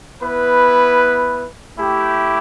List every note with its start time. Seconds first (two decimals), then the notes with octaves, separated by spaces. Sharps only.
0.22 B3 E4 B4
1.77 A3 E4 G4